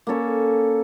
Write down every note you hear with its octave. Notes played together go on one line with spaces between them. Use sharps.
A#3 C#4 A4 C#5